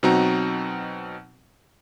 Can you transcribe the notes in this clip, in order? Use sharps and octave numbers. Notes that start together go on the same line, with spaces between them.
B2 F#3 C4 D#4 F#4 A#5